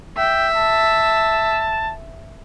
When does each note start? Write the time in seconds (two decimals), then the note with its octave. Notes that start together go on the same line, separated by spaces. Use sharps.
0.17 E5 G5
0.56 A5